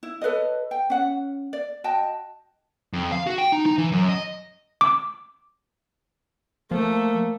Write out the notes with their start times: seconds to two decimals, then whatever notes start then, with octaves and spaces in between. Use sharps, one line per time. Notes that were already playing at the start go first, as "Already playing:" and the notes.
0.03 E4
0.22 A4 B4 C#5 D#5
0.71 G5
0.90 C#4 F#5
1.53 D5
1.84 F#4 D#5 G5 A5
2.93 F2
3.12 F5
3.27 F#4
3.38 G5
3.52 D#4
3.66 D#4
3.78 E3
3.92 F#2
4.09 D#5
4.81 D6
6.71 F3 A3 A#3